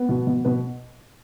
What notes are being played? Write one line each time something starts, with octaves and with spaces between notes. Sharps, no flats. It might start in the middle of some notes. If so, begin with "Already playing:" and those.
Already playing: B3
B2
B2
B2 B4